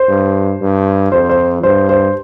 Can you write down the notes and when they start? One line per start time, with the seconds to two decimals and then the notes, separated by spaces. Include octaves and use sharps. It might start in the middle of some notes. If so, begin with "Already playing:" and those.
Already playing: C5
0.09 G2
0.61 G2
1.12 F2 C5
1.29 C5
1.63 G2 C5
1.89 C5